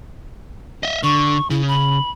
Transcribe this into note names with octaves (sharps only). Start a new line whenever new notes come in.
D#5 E5
D3 C#6
C#3 E4
B5